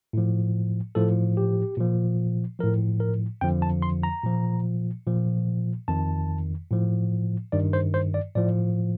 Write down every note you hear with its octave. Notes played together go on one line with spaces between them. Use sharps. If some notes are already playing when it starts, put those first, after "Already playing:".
A2 F3
A2 F3 A4
G4
A#2 F3
A2 F3 A#4
A#4
F2 D3 F3 G5
A5
C6
A#5
A#2 F3
A#2 F3
F2 D#3 A5
A2 F3
G2 D#3 D5
C5
C5
D5
A2 F3 D5